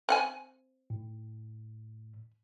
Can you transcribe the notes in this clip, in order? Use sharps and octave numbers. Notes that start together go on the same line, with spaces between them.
C4 F#5 G#5
A2